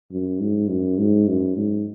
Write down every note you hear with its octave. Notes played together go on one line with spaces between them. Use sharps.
F#2
G#2
F#2
G#2
F#2
G#2